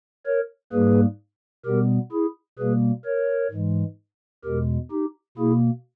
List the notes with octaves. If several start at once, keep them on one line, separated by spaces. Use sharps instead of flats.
A#4 C#5
G#2 G3 A#3 G#4 B4
B2 G3 B3 G4 A#4
E4 G#4
B2 G3 A#3 G#4 B4
A#4 C#5
G#2 E3 G#3
E2 B2 G#3 G4 A#4
D#4 G4
B2 A#3 E4 G#4